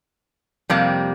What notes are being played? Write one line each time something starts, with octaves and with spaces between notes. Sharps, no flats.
F2 C3 G3 A#3